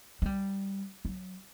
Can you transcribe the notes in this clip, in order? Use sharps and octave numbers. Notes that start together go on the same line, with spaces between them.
G#3
G3
F#3